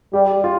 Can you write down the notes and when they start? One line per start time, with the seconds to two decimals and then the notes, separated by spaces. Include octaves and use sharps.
0.13 G3 G4
0.44 F4